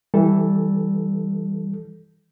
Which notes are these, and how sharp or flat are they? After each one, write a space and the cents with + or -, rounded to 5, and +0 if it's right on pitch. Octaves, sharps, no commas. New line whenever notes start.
E3 -15 G3 +0 A4 -5